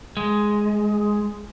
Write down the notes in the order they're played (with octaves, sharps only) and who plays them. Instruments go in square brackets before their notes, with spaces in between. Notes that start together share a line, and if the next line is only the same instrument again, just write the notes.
[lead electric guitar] G#3